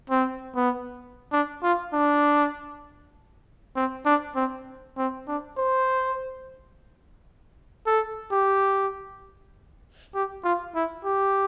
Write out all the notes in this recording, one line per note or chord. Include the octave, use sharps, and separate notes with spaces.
C4
B3
D4
F4
D4
C4
D4
C4
C4
D4
C5
A4
G4
G4
F4
E4
G4